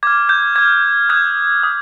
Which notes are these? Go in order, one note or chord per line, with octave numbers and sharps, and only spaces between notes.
D6 F6 G#6
G6
D6 F6 G#6
D#6 F#6 G#6
D#6 F#6